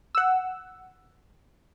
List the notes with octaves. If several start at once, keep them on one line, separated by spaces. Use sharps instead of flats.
F#5 E6